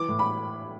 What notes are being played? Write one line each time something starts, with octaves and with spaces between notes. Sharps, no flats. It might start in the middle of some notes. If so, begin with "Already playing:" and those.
Already playing: E3 D6
A2
B5